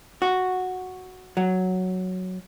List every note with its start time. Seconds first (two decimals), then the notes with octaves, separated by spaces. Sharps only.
0.22 F#4
1.37 F#3